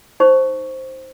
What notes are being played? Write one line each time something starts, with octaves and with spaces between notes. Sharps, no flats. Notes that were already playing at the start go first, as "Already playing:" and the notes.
D#4 C5 C#6